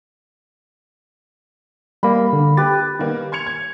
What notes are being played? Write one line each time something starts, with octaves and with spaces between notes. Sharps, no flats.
G3 A#3 B5
D3
G4 B4 A6
D#3 G3 A#3 B3
C6 G#6 C#7 F7
G#6